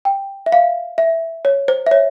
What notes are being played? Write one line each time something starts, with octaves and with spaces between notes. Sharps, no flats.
G5
E5
F5
E5
C#5
C5
E5
C#5